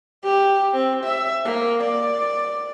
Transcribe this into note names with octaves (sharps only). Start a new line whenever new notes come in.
G4
C4
E5
A#3
D5